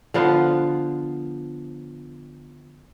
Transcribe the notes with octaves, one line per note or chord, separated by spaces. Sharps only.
D3 F3 B3 F4